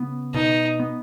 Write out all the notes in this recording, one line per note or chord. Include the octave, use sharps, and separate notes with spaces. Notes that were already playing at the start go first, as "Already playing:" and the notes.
Already playing: C#3 B3
B2 D#4
B3